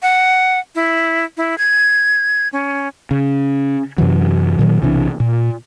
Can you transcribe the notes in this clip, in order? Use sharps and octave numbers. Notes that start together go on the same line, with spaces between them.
F#5
E4
E4
G#6
C#4
C#3
F#2 C3 E3 F#3
A#2 D#3 F#3
B1 C3 E3 D4
A#2